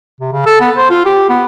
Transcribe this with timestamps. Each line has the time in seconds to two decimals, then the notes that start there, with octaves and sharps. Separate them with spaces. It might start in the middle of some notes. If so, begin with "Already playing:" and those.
0.20 C3
0.33 C#3
0.46 A4
0.61 B3
0.76 C5
0.90 F4
1.05 G4
1.29 B3